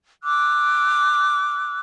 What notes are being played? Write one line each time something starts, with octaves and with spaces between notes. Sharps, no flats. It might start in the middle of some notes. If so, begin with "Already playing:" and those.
D6 E6 F#6